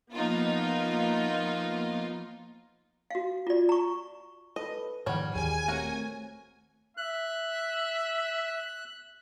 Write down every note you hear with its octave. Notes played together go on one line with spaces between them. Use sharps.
F3 A#3 B3 D#4 F4
F#4 F5
F4 D5
A#5 C#6
A4 B4 D#5
G#2 D#3 F3 G3 A#3 C#5 F#5 F6
D#1 D#2 D#3 G4 G#4 G#5
A3 C4 F#4 A#4 C#5
E5 F#6